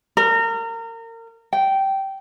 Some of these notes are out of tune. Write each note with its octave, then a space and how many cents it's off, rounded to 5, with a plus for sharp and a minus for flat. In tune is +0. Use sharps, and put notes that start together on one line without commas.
A#4 -30
G5 -15